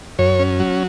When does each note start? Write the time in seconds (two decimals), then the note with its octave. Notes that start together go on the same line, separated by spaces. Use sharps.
0.19 F#2 C#5
0.39 C#4
0.60 F#3